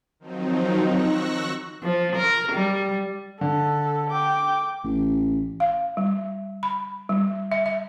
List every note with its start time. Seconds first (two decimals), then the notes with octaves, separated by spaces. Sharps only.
0.20 D#3 F3 F#3 C4 D#4
0.87 C#6 E6 F#6 A#6
1.83 F3
2.16 A#4
2.52 G3
3.41 D3 A4
4.10 G5 D6
4.84 A1
5.60 F5
5.97 G3
6.63 B5
7.09 G3
7.52 E5
7.66 E5